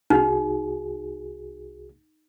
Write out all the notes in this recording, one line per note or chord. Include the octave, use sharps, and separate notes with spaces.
C2 D#4 F#4 G#4